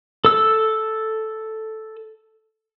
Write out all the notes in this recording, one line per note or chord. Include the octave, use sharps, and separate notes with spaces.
A4 E6